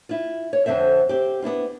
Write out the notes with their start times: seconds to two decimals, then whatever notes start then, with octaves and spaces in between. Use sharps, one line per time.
0.09 E4 F4
0.53 C#5
0.66 F2 D3 C4 C5 E5
1.09 C4 G4
1.42 B3 D4 E4 F4